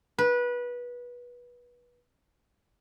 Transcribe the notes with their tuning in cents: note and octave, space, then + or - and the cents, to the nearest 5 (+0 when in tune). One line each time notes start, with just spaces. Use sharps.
B4 -20